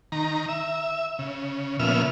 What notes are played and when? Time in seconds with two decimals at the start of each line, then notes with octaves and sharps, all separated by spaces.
0.12 D#3 A#5
0.48 E5
1.19 C#3
1.80 A#2 C#3 F3 B3 E5 F6